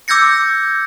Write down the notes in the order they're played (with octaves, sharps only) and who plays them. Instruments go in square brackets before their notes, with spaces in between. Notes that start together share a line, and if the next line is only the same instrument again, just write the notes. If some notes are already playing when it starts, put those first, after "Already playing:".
[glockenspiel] D6 E6 G6 G#6 A#6 C#7